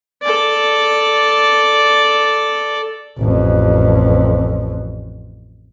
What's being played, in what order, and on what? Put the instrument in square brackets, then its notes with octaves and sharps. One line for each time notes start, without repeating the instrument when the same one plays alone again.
[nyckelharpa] A4 D5
[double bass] A1 F2